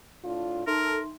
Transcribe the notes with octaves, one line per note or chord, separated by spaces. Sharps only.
A2 D4 F4
D#4 A4 A#4 E5 C6